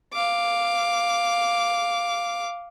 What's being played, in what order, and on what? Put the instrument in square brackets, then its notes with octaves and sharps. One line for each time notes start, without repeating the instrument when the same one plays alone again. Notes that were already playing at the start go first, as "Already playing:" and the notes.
[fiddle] F5 D6